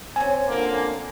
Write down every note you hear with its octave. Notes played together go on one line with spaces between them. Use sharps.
C4 C#4 G#5
D3 F3 A#3